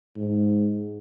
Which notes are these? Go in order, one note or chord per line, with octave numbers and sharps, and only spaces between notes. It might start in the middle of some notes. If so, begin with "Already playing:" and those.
G#2